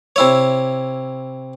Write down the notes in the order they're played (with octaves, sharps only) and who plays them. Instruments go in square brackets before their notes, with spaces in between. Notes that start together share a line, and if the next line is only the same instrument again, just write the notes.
[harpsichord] C3 E4 C#5